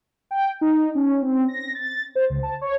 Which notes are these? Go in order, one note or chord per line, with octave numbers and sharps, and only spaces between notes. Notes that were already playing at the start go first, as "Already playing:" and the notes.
G5
D#4
C#4
C4
A#6
A6
C5
C#2
A5
C#5